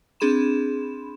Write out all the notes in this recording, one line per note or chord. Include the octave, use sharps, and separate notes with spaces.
C4 D4 G#4 B5 C6 E7